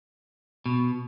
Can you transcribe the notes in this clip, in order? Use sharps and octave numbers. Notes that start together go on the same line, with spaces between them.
B2